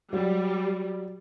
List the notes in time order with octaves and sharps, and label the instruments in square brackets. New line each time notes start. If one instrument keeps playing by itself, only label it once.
[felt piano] F#3 [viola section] G3